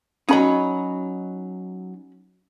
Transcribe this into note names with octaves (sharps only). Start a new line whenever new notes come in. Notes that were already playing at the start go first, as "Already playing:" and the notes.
F#3 C#4 D#4 B5